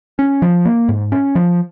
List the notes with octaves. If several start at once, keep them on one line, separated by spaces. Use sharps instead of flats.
C#4
F3
A#3
G#2
C#4
F3